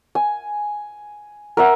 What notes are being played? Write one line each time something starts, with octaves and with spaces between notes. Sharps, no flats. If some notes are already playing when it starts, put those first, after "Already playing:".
G#5
A#4 E5 F#5